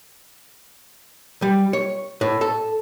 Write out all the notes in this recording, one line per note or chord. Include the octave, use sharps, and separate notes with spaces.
G3
C#5
A2
A4